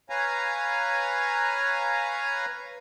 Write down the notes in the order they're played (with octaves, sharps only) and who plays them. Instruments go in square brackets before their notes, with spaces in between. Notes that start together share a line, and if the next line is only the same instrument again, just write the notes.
[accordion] B4 C#5 F5 G#5 A#5